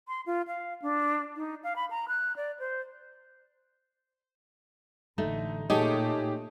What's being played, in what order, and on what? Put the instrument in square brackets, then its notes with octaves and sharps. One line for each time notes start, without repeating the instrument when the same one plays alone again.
[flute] C6
F4
F5
D4
D#4
F5
B5
A#5
F#6
D5
C5
[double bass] A1 D3 [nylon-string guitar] A3 [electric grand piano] D#4
[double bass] A#2 A3 [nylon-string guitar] D#4 C#5 [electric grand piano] G4 G#4 [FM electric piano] D#5 A5